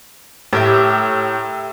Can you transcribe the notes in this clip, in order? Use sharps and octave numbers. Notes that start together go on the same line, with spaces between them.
A2 G4 A#4 E5